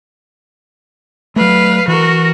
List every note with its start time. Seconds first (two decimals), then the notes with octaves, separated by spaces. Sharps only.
1.36 F#3 A3 B4 F5
1.88 E3 F#4 A#4